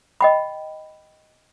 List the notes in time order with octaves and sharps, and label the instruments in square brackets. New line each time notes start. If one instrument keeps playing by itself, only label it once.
[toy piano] D#5 G5 B5